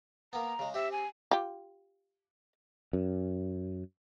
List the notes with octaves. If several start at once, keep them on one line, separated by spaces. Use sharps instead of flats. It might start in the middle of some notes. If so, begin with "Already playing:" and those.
A#3 B3 A#5
C#3 G#3
C4 G4 E5
G#5
F4 G4
F#2